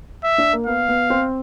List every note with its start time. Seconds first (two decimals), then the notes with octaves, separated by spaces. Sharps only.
0.24 E5
0.38 D4
0.53 A#3
0.67 B3 F5
0.89 B3
1.10 C4